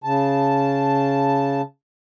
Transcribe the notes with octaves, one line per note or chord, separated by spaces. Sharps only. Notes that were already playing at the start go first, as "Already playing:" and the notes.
C#3 A5